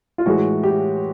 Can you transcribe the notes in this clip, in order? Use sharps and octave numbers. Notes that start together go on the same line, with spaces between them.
F4
A2 E3 G#3 F#4
G4